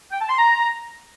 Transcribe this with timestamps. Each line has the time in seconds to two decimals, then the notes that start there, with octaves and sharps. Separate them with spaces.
0.11 G5
0.20 A5
0.29 C6
0.38 A#5